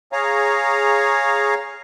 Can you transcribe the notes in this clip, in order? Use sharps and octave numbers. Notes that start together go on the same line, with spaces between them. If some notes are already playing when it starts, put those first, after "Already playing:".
G#4 C#5 F5 A#5